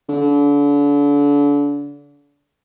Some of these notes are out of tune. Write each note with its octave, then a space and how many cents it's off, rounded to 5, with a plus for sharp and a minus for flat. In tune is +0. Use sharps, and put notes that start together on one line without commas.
D3 -35